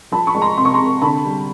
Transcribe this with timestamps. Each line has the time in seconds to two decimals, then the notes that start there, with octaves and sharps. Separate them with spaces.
0.12 F3 A5 B5
0.27 B5 C#6
0.35 G#3
0.42 A#5 C6
0.57 C3 C6
0.65 C#6
0.74 A#5 C6
0.79 C3
1.02 D3 A5 B5
1.24 G3